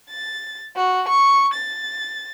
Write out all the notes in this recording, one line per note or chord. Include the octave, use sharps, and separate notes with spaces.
A6
F#4
C#6
A6